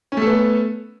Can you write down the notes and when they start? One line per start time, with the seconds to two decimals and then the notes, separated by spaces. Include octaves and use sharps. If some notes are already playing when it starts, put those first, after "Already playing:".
0.12 C#4
0.17 A3
0.22 A4
0.27 B3